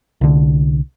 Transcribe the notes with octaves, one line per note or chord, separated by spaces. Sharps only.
C2 D3